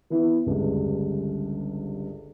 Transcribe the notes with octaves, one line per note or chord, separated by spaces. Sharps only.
E3 B3 E4
G1 C#2 G2